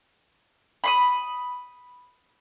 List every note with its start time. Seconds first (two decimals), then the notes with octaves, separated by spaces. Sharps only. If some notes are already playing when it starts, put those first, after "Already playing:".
0.84 B5 C6 D#6